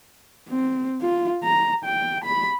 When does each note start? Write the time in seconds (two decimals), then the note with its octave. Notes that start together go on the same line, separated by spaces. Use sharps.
0.49 C4
1.01 F4
1.44 A#5
1.84 G5
2.24 B5